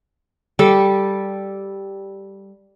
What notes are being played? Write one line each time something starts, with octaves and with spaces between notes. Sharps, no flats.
G3 A4